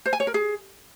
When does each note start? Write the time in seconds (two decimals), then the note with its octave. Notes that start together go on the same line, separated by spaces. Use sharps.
0.06 C5
0.13 G#5
0.20 C#5
0.27 A#4
0.34 G#4